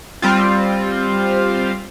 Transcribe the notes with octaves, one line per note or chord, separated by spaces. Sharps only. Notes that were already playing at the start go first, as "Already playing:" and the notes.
G3 C4 F4